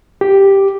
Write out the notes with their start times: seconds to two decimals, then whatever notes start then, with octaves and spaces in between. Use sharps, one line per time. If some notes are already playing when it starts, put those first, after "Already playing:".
0.21 G4